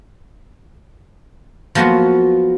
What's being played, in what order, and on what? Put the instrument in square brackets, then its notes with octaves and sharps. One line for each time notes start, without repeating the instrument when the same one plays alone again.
[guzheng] F3 F#3 A#3 B3 F4 F#4